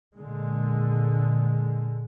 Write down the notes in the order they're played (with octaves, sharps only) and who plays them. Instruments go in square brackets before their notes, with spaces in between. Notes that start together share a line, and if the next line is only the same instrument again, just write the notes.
[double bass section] A#2 D3 G#3